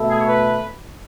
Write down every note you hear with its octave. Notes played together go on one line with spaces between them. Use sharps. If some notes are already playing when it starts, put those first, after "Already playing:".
Already playing: B2 A3 E4 A4
G#4
C#5
B4